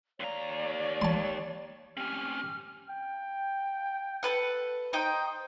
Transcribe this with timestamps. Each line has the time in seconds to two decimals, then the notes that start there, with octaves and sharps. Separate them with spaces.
0.20 D#2 C#5 D5 F5 A#5
1.02 A5 C6
1.97 C4 C#4 G4 F6
2.90 G5
4.23 A4 B4 F#5
4.93 D#4 C5 D#5 G5